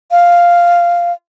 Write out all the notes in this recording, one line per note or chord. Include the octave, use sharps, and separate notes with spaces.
F5